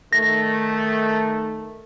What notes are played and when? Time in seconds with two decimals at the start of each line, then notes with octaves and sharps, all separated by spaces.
0.13 D#3 A3 A#6